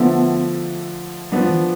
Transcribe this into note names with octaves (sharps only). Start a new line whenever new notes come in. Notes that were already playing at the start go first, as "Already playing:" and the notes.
Already playing: D3 F3 A3 B3 E4
F3 G3 B3 D4
E3